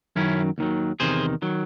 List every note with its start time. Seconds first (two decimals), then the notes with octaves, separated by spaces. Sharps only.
0.16 F#2 D#3 F#3 C#4 E4
0.58 D#2 D#3 F#3
1.00 E2 C3 D#3 G#4 C5
1.42 D#3 F#3